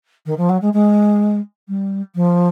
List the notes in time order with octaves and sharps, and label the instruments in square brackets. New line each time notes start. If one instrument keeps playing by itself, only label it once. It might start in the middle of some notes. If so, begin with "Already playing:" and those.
[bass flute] D#3
F3
F#3
G#3
G#3
G3
F3